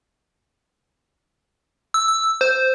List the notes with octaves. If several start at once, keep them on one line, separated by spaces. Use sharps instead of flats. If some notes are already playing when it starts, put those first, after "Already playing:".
E6
E6
C5